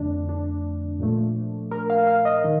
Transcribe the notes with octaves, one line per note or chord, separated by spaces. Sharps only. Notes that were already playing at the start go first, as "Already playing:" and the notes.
Already playing: F2 D3 A3 D4
D4
A#2 F3 A3
A#4
F5
F5
D#5
D#3